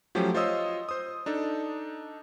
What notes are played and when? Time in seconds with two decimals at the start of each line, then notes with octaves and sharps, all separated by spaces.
0.15 F3 F#3 A3 C#4 G4
0.34 F4 C5 C#5 D#5 D#6 E6
0.89 C5 D#6
1.26 D4 D#4 A4